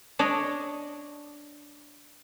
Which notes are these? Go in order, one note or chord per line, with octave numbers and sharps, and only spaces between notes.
D4 C#5 D#5